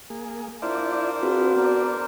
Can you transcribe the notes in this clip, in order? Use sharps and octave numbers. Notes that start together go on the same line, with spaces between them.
A#3 G#4
D4 E4 F4 A#4 C5 D5
C4 F4 F#4 G#4 B4
B3 D5 A#5